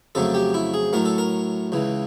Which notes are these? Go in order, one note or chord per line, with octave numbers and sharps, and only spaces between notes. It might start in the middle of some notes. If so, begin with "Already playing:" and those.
F2 C#3 F#3 A3 A4
G4
E4
G#4
A2 F#3 A3 A#4
A4
A#4
C#2 C#3 E3